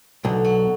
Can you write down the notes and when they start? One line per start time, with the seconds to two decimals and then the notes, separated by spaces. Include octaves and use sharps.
0.24 B1 D3
0.45 F#3